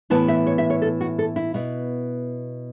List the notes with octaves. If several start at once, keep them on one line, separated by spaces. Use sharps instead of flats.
A2 E3 B3 E4 A5
E5
C#5
E5
C#5
A4
F#4
A4
E4
B2 B3 E4